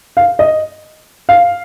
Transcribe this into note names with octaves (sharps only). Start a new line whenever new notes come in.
F5
D#5
F5